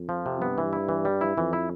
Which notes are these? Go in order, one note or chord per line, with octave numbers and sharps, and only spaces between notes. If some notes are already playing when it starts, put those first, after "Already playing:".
Already playing: F2
F3
C3
G2 B3
E3
E4
E3
G3
E4
F2 E3
E4